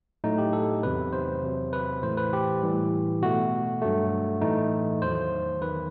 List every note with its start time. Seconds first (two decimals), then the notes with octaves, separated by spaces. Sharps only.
0.24 A2 F#3 A3 D#4
0.38 G4
0.53 A4
0.83 E2 C3 F#3 B4
1.13 C5
1.43 E2 C3 F#3
1.73 B4
2.02 A2 E3 A3 C5
2.17 B4
2.33 G4
2.62 A2 E3 G3
3.22 B2 A3 F#4
3.82 G2 F#3 A3
4.41 A2 E3 A3 D#4
5.02 E2 D#3 F#3 C5
5.61 E2 D#3 F#3 B4